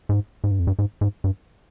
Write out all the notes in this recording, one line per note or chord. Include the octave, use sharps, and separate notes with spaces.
G#2
G#2
G2
F2
G2
G#2
G#2
G2